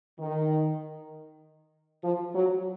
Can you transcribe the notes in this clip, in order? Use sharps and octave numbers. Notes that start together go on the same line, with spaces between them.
D#3
F3
F#3